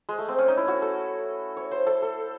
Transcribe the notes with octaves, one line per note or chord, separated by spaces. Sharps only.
G#3
A3
C4
C#4
D#4
E4
F#4
A4
C#5
C5
A4
A4